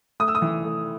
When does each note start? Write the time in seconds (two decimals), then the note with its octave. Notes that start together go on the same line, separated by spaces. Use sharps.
0.20 A3 D#6
0.28 E6
0.35 D#6
0.42 E3
0.64 A3